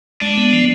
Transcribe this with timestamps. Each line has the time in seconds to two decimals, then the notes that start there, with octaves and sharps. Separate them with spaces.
0.21 G#3 D4
0.38 B3
0.53 F3